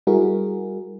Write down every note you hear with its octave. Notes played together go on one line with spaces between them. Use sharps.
G3 E4 F#4 G#4 A#4